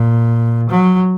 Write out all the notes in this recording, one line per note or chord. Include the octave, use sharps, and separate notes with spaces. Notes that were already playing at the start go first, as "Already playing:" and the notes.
Already playing: A#2
F#3